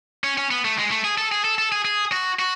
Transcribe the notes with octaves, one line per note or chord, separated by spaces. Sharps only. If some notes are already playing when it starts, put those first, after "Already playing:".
C#4
C#4
B3
A3
G#3
A3
G#4
A4
G#4
A4
A4
G#4
G#4
F#4
F#4